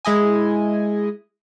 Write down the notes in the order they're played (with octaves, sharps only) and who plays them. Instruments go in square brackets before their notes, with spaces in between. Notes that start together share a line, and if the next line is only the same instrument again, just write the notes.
[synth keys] G#3 E4 D#5 G#5